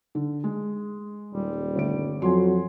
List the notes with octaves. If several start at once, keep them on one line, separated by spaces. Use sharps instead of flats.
D3
G#3
D#1 G3
G1 A3 D7
F2 F#3 G#5 C6